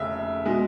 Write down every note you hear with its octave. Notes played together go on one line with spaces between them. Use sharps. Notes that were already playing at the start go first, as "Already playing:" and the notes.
Already playing: F1 C#3 E5
B2 G#3